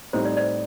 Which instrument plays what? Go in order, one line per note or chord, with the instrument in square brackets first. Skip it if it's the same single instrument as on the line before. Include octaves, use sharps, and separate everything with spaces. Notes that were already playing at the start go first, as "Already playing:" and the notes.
[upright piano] A2 G3 C4 D#4 [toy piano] C5
[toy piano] D5
D5